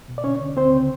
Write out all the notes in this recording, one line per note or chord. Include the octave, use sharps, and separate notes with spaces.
B2
D5
D3 C#4 C#5
D3
D2 C4 C5
C#3